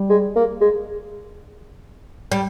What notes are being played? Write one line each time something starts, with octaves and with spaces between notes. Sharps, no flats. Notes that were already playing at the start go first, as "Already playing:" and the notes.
Already playing: G3
G#3
A#3
G#3
G3